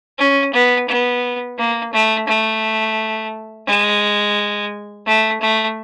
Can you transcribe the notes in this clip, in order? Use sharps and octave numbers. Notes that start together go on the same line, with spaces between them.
C#4
B3
B3
A#3
A3
A3
G#3
A3
A3